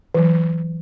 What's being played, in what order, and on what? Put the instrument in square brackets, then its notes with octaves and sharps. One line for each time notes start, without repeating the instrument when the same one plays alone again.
[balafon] E3 F#3